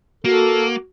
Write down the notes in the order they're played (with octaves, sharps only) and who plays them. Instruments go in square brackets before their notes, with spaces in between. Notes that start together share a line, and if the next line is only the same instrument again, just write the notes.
[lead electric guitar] A#3 [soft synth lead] F#4 [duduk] A4